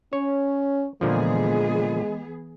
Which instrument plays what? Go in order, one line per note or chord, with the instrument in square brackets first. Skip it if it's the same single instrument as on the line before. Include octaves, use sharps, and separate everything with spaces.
[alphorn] C#4 [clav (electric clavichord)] C#5
[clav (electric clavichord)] A#2 D3 F3 [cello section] E3 B3 G#4 [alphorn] G#3